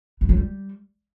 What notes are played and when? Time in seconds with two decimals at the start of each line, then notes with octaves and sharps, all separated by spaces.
0.21 E3
0.29 F#3
0.37 G3